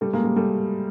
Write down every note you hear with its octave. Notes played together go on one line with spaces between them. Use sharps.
G3 A3
G#3 A#3
G3 A3
G3 A3